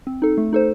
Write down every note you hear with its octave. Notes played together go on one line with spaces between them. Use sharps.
C4
D#4 A4
A3
D#4 A4 C5